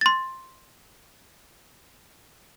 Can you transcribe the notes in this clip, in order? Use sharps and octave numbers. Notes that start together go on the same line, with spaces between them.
C6 A6